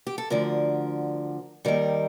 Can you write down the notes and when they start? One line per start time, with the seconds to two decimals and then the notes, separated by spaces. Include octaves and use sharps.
0.07 G4
0.18 A4
0.30 D2 D3 F3 A#4
1.65 D#2 D#3 G3 A#4